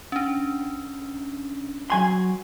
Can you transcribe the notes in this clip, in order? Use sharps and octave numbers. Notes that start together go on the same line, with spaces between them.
C#4 D4
F#3 G#5 C6 C#6